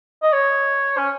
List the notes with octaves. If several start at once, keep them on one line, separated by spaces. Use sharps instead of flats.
D#5
C#5
C#4